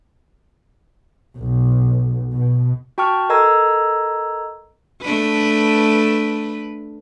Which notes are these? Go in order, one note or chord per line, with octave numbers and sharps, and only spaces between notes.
B1
B2
F#4 G5 A5 C#6 F6
A4 A#4 D#5 A#5 E6 G#6
A3 D4 B4